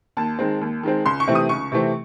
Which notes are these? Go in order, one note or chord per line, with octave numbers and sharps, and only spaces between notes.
D#2 A5
D#3 G#3 C4
D#2
D#3 G#3 C4
C#2 C6
C#6
C3 E3 A3 C4
D#6
C#2 C#6
C3 E3 A3 C4